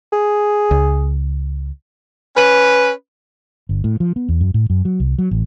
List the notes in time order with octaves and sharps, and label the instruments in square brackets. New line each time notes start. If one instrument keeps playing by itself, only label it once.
[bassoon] G#4
[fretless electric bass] C#2
[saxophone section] C#4 B4
[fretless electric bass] G1
A2
F3
B3
E2
F#2
A2
F#2
F#3
C2
F#3
A1